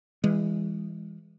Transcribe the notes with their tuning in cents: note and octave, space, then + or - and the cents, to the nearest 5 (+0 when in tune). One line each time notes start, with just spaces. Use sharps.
E3 +0 G#3 -30